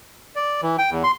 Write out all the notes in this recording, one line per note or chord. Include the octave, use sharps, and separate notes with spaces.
D5
E3
G5
E2
C6